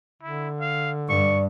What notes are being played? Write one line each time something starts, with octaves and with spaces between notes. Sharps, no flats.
D3 E4
F5
G2 D5 C#6